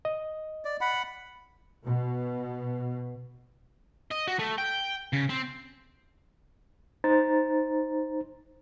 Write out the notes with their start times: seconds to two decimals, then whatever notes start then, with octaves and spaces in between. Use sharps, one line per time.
0.05 D#5
0.65 D5
0.81 F#5 B5
1.85 B2
4.11 D#5
4.28 F#4
4.39 A3
4.58 G5
5.13 C#3
5.29 C4
7.04 D#4 C5 A#5 A6